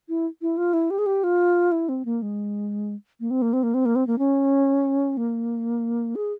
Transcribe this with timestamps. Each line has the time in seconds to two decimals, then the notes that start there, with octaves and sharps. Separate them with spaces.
0.09 E4
0.42 E4
0.57 F4
0.73 E4
0.90 G4
0.98 G#4
1.06 G4
1.24 F4
1.72 E4
1.89 C4
2.05 A#3
2.22 G#3
3.20 A#3
3.30 C4
3.42 A#3
3.53 C4
3.63 A#3
3.74 C4
3.85 A#3
3.95 C4
4.07 A#3
4.18 C#4
5.17 A#3
6.15 G#4